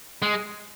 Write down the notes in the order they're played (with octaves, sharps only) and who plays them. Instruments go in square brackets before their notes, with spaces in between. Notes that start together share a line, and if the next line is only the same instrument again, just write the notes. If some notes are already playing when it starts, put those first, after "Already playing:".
[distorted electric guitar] G#3